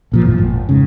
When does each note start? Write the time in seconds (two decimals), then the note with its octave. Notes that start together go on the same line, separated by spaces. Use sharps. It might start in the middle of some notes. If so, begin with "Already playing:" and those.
0.12 A#1 A#2 F3
0.25 G1 E2 A2 E3
0.38 G#1
0.69 F1 G#2 C#3